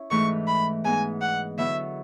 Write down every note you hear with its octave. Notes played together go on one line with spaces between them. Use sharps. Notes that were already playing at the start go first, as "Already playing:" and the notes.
Already playing: C#4 E4
G#2 E3 A3 C#6
B5
G#2 G#3 B3 G#5
F#5
D3 F#3 B3 E4 E5